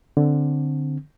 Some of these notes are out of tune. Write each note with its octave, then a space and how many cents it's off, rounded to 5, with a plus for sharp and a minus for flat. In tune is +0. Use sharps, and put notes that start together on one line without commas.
D3 +0 C4 +0